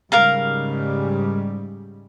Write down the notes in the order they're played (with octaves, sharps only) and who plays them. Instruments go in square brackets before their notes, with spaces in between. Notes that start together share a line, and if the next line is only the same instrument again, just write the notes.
[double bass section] G#2 C#3 G3 [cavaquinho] A#4 F5 A#5